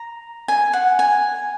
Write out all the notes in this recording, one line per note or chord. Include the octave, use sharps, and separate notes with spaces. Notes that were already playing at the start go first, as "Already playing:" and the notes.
Already playing: A#5
G#5
F#5
G#5